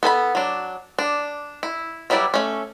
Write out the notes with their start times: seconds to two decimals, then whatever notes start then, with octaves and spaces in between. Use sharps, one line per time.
0.03 B3 A4 G#5 B5
0.35 F#3 D4
0.99 D4
1.63 E4
2.10 F#3 G3 E4 B4 D5
2.34 A3 C#4